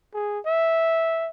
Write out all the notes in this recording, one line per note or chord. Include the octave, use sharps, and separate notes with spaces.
G#4
E5